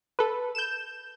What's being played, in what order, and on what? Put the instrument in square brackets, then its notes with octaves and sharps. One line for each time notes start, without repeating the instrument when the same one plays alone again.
[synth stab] A4 B4
G6 E7